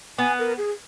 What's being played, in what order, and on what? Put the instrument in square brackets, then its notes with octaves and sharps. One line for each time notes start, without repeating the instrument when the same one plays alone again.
[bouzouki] B3 [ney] G#5
[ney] A#4
G#4